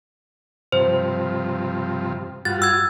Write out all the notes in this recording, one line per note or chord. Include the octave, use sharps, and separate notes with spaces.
G2 C3 F3 C5
G2 F4 F#4 A6
E6 G#6